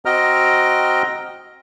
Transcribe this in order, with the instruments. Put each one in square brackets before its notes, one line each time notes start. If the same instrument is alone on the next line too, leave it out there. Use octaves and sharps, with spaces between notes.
[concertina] C4 F#4 D#5 G5 A#5 F6